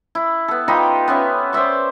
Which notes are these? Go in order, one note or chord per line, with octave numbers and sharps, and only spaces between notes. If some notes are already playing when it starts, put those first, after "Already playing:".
E4
B3 A4
D#4 F4 G4 B5
B3 C#4 E5 C#6
C5 D5 E5 C#6